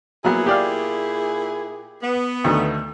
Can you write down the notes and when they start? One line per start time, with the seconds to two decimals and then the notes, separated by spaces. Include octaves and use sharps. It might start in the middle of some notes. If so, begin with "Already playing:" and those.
0.24 A#2 F#3 A#3 B3 E4 G#4
0.46 G4 D5 F5
2.02 B3
2.44 D2 D#3 A3